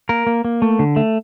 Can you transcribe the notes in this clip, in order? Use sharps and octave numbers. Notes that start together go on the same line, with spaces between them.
A#3 A#4
A#3
A#3
A3
D3
A3